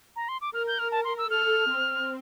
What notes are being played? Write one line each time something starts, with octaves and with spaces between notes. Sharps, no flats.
A#5
C6
D6
A#4 F6
G6
F6
A5
C6
E6
A4 F6
C4